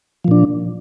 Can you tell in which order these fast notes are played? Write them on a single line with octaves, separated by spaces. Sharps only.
F3 A#2 D4